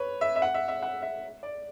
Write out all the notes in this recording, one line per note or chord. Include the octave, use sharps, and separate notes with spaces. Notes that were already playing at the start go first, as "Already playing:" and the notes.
Already playing: B4 C#5
E5
E5
F#5
E5
E5
F#5
E5
D5